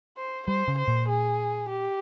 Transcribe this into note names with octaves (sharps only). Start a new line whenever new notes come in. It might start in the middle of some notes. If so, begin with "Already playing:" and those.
C5
G3 C5
C#3
C5
A#2
G#4
G4